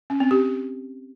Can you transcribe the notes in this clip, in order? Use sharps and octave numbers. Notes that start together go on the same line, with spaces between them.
C#4
C4
G4